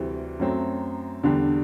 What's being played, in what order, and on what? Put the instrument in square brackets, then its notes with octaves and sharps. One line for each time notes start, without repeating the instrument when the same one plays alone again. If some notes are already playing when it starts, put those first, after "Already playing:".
Already playing: [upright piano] D2 C3 E3 G3 C4
F#2 F#3 A3 C4
E2 D3 G3 D4 G4